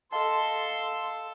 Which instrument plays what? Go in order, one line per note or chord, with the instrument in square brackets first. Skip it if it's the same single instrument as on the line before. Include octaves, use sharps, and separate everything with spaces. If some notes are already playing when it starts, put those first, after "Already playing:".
[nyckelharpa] A4 [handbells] D#5 F5 A5 [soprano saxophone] C6